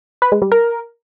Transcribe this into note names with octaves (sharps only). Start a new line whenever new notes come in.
B4
G#3
G3
A#4